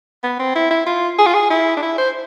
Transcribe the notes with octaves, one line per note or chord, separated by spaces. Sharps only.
B3
C4
E4
E4
F4
G#4
F4
G#4
E4
D4
E4
C5